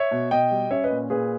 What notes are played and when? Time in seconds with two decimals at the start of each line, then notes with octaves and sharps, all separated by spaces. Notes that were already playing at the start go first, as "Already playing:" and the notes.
Already playing: C#5 E5
0.11 B2
0.31 B2 D#5 G5
0.51 G3
0.71 C#4 C#5 E5
0.84 B4 D#5
0.91 A#2
1.10 A#2 G#4 B4